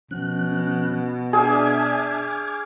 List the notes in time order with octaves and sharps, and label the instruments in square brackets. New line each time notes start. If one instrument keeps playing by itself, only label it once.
[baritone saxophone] B2 [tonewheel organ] F3 C#4 F#6
[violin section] D4 E5 G#5 [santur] G#4 [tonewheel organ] D6 F6 G#6